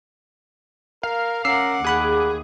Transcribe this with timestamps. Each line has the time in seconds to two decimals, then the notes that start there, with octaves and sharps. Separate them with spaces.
1.03 A#4 F5
1.45 C#4 A#4 F#5 D6 E6 C7
1.85 D#2 G#4 F#5 B5 F#6